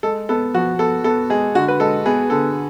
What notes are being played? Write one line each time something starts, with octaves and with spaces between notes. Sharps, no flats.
G#3 A4
B3 A4
F3 F#4
B3 A4
B3 A4
G#3 G#4
D3 F#4
B4
G#3 A4
B3 G#4
D3 A4